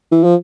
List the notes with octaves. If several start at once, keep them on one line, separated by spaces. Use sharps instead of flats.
E3
F3